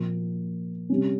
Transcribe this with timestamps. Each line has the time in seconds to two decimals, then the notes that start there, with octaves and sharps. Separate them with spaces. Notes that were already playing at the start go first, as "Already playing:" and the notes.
Already playing: A#2 F3 A#3
0.89 C3 G3 C#4